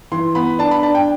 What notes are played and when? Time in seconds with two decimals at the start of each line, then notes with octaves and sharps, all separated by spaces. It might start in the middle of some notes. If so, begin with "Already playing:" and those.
0.12 E3 C6
0.35 B3 B5
0.59 D4 A5
0.71 B5
0.83 D4 A5
0.95 G5